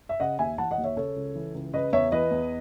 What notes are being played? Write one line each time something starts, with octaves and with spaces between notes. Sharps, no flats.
E5
C#3 D#5 F#5
D#2 E5 G#5
E3 F#5 A5
D#5 F#5
D#2
C#5 E5
C#3 A4 C#5
C#2
E3
C#2
C#3 B4 D#5
E2 C#5 E5
E3 B4 D#5
E2